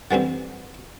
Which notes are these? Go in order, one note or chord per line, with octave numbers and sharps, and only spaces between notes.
D3 E3 G3 C4